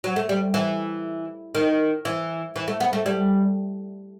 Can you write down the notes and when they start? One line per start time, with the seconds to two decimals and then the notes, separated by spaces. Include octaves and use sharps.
0.04 F#3
0.16 A3
0.29 G3
0.54 E3
1.55 D#3
2.05 E3
2.56 E3
2.68 A3
2.80 B3
2.93 A3
3.06 G3